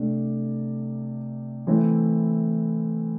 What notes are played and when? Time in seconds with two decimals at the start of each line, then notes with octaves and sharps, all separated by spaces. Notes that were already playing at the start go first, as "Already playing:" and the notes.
Already playing: C3 A3 D4
1.67 E3 A3 C4 E4